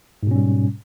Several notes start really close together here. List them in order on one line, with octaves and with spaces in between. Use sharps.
G#2 B2 C#4 G3